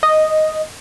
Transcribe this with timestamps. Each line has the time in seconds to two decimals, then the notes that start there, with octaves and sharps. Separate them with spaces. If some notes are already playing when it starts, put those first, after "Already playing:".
0.03 D#5